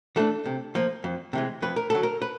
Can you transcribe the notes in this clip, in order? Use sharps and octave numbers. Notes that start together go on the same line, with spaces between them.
E3 A3 D4 A4
C3
F3 A#3
F2
C3 E3 G#3
F2 B4
A#4
D3 F#3 A4
A#4
B4